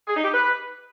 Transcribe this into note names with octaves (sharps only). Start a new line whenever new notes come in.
G#4
D#4
G4
B4